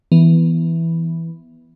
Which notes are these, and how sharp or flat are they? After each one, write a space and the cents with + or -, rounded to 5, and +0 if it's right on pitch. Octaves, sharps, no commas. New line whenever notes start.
E3 +0 B3 +0